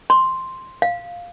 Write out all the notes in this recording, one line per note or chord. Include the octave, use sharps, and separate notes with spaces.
C6
F5